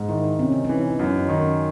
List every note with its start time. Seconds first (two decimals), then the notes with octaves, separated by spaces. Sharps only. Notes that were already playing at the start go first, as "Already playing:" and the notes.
Already playing: G#2
0.09 D#3 E4
0.24 D#4
0.39 C3 C#4
0.52 D#4
0.65 E3 C#4
0.78 D#4
0.90 C#4
0.99 F#2 D#4
1.17 C#4
1.28 D#3 D#4
1.42 C#4